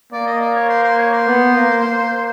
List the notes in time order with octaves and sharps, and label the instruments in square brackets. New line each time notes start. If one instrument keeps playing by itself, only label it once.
[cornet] A#3 [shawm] D5
[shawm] D#5
D5
C#5
C5
C5
C#5
C5
[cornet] B3
A#3
A#3